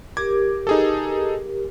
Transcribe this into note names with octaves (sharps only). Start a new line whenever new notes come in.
G4 A#4 D6 G#6
D#4 G#4 A4